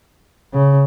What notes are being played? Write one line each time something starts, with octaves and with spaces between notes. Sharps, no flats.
C#3